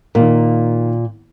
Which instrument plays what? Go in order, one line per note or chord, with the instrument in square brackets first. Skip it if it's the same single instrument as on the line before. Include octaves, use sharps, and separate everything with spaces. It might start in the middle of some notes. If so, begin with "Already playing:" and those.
[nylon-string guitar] A#2 [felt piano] D#3 A#3